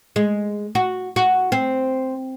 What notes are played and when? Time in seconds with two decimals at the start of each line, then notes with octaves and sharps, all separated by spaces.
0.16 G#3
0.75 F#4
1.16 F#4
1.52 C4